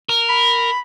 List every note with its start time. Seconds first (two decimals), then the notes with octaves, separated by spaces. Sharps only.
0.09 A#4
0.29 B5